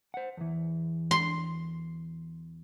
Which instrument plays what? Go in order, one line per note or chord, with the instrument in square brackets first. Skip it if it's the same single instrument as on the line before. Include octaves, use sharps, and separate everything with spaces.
[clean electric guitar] C5 F#5
E2 E3
[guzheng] C6